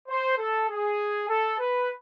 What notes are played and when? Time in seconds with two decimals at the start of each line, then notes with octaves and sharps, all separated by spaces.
0.08 C5
0.38 A4
0.69 G#4
1.29 A4
1.59 B4